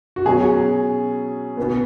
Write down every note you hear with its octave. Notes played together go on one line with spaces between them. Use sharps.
F#4
B2 F#3 C#4 G#4
B2 B3